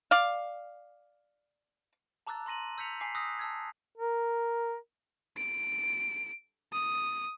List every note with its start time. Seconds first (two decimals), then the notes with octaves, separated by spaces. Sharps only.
0.11 D5 F5
2.27 A5 A#5 D6 E6 F#6 A6
2.46 A#5 C6 A#6 D#7 F#7
2.78 E6 G6 B6 C#7 F7
3.00 G#5 D6 B6 C7
3.15 D#6 E6 F#6 G6 A#6 B6
3.39 A5 E6 G#6
3.98 A#4
5.38 D7
6.73 D#6